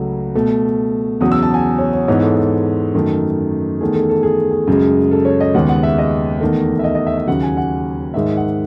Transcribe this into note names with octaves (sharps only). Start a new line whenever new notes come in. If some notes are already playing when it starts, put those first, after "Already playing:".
Already playing: C#2 C#3 F#3 A3
B2 A3
E2 C#3 F#3 D#6
E6
A5
G#5
C#5
C#5
G#2 E3 G#3 B3 C#5
A4
A4
F#2 D#3 A3
E2 D#3 A3 G#4
A4
A4
G#4
G#4
F#2 C#3 G#3
A4
C#5
D#5
D#2 C#3 G#3 B3 F#5
F#5
E5
D#5
E2 D#3 A3
E5
D#5
D#5
E5
E5
D#2 C#3 F#3 F#5
G#5
F#5
G#2 D#3 G#3 E5
F#5